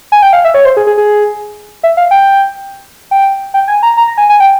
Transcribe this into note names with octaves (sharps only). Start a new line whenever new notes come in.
G#5
G5
F5
E5
C#5
C5
G#4
G#4
G#4
E5
F5
G5
G5
G5
G#5
A#5
A#5
A#5
G#5
G#5
G5